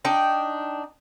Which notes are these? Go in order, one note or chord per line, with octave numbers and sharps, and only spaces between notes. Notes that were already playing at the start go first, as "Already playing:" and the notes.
D4 D#4 G5